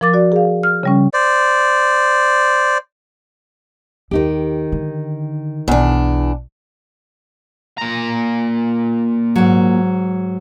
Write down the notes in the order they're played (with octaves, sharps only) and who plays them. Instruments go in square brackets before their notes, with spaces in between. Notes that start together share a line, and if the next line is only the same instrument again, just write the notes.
[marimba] F3 A#4 D6 A6
F#4 D5
G#4 F5
F6
C#3 G3 C#4
[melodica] C5 D5
[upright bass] D#2 [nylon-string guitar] D#3 D#4 G4
[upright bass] D3
[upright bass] B1 [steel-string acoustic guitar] E2 D4
[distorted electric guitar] A#2 A#5
[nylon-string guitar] G#2 F#3